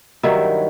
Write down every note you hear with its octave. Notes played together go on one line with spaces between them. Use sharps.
G2 D#3 F#3 E4